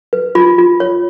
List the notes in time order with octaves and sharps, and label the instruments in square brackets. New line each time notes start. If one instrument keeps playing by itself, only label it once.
[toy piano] B4
F4 B5
F4
C#5